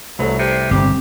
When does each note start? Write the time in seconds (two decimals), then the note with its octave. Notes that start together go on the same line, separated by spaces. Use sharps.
0.19 C2 F#3 A3 B4
0.38 C3
0.71 G1 C4 G4